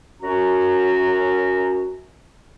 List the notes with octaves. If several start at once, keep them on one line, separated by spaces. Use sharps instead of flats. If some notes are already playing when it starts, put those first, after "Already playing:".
F#2 C#4 F#4 A#5